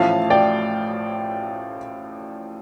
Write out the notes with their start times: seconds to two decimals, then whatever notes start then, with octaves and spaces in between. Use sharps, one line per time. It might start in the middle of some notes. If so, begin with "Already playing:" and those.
Already playing: A1 A2 F3 A3 F5 A5
0.30 D5 G5